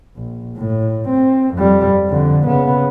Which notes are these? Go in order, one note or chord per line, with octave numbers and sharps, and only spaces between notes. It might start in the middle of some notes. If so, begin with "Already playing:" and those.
A#1
A2
C4
F2 G3
F2 D3
C#3 B3